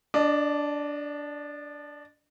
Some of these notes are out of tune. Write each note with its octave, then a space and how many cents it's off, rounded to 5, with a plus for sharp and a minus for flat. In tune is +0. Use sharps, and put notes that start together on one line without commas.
D4 -10 D#5 -45